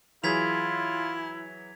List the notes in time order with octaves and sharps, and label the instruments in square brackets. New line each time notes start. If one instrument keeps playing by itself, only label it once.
[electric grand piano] E3 F#3 G#4 [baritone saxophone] E4 [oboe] F4 [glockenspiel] G#6 B6 F7